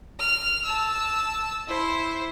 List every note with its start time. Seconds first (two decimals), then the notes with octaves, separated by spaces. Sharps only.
0.19 F6
0.65 A5 E6
1.68 E4 C5